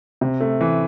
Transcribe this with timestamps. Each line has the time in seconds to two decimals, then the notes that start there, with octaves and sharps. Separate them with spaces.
0.21 C3
0.40 A3
0.61 E3